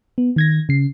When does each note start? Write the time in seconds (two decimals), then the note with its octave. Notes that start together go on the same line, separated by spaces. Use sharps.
0.18 B3
0.36 D#3 G#6 A#6
0.69 C#3 C7